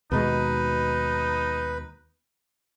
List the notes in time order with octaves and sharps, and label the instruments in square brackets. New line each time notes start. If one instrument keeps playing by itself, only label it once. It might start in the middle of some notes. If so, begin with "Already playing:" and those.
[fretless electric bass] D#2 B2 G#3 [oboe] D#4 [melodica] B4